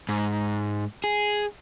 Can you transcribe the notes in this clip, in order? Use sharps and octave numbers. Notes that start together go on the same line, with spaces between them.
G#2
G#4